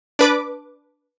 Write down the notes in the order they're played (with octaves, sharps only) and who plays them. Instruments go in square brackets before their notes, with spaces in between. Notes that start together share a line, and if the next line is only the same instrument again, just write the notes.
[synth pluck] D4 B4 D6